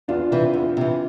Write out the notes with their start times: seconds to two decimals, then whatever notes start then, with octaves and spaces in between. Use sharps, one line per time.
0.08 E2 D4 F4
0.32 C3 E3
0.54 E2
0.77 C3 E3